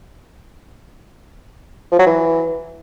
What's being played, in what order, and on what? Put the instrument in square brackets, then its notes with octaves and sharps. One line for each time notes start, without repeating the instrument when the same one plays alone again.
[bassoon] F3
F#3
E3